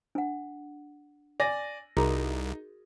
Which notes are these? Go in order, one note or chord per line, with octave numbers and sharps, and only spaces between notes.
D4 F#5
D5 G#5 A#6
C2 D#4 F#4 G#4 A#4 A#5